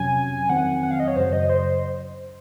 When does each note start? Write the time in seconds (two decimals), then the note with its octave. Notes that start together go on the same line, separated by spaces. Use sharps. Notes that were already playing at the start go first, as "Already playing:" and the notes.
Already playing: F2 C3 F#3 C#4 G#5
0.49 F2 D#3 F#3 C4 F#5
0.83 F#5
0.91 F5
1.00 D#5
1.08 C#5
1.16 F#2 C#3 F#3 C5
1.33 D#5
1.49 C5